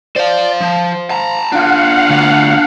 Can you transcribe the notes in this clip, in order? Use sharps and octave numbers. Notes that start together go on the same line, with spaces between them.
C5 D5 F5
F3
A5 A#5
D4 F4 F5 F#5
D2